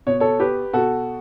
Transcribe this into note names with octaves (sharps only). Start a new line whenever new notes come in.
B2 C#5
A4 C#5
G4 B4
B2 F#4 A4